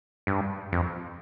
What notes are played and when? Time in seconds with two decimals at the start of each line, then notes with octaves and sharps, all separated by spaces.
0.27 G2
0.73 F2